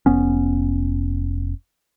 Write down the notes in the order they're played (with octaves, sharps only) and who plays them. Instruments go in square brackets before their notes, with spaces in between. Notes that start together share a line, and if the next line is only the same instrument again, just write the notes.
[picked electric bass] F1 B3 C#4